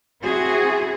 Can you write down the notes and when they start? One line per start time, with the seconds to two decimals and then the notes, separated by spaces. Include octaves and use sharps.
0.22 C4 E4 F#4 G#4